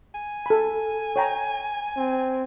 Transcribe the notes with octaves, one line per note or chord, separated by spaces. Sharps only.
G#5
A4 B5
C#5 G5 A#5
C4